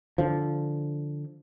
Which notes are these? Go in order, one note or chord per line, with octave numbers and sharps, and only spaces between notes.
D3 F3